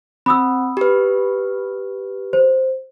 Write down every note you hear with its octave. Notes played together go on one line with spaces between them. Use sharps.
C4 B5 D#6 E6
G4 B4
C5